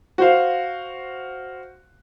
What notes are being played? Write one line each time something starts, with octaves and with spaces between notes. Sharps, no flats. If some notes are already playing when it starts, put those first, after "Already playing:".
F#4 C5 F5